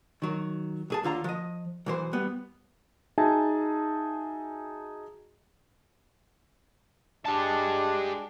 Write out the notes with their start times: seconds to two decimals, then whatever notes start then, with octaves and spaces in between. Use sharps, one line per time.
0.22 D#3 F#3
0.90 B1 G#4 A5
1.03 D#2 D3 F4 A#5
1.24 F3 D#5
1.86 B1 E3 C5
2.13 G3 B3
3.18 D#4 F#4 G#4 E5 G#5 A5
7.26 G#3 D4 G4 A5